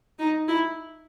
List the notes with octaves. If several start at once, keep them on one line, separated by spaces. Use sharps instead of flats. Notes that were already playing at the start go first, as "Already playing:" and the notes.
D#4
E4